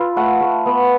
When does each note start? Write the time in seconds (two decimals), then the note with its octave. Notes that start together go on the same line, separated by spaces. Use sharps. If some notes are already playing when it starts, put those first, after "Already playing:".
Already playing: F4 A4 B4
0.16 A3 F#5
0.41 A3
0.66 B3